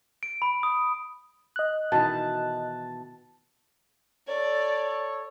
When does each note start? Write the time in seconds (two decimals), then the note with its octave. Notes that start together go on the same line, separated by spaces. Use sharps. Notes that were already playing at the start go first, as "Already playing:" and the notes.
0.23 D7
0.42 B5
0.63 D#6
1.56 D#5 F#6
1.92 B2 D#3 E3 A5
4.28 A4 C#5 D5